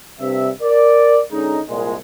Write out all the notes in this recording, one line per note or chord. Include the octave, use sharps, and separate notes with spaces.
G2 C3 E5
A#4 D5
D3 G#3 C#4 D#4
C2 A#2 G#3